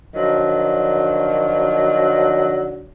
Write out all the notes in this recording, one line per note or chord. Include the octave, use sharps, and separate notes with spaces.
D3 D#3 F3 F#3